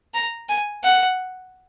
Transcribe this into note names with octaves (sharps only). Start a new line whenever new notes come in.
A#5
G#5
F#5